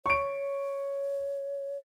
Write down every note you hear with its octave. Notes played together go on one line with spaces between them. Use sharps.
C#5 C#6 D7